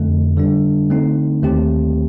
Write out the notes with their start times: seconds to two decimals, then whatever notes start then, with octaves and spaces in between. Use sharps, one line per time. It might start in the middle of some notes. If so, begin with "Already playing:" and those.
Already playing: F2 D3 A3
0.37 D3 G3 D4
0.90 D3 A3 C4 D#4
1.43 D#2 D#3 A3 C4 G4